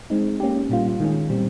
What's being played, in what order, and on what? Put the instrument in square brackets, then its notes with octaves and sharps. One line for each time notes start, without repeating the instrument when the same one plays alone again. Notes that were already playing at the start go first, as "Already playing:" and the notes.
[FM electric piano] G#3 C4 D#4
A#3 C#4 G4
A#2 G3 A#3 F4
D#3 G#3 C#4
A#2 G3 C4